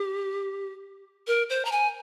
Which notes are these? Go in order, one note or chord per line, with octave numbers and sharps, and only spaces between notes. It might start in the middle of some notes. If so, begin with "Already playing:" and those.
Already playing: G4
A#4
C5
A#5
G#5